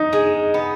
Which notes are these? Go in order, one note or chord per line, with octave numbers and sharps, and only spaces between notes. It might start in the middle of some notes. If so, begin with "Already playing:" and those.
Already playing: D#4
G#3
B3